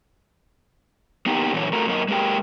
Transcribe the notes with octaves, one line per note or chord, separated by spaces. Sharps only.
A#3 B3 D#4 G4
A#2 D3 E3 F#3 C#5
A3 F#4 A#4
F#2 A#3 A#4 D#5
G#3 A#3 G4 A#4 G5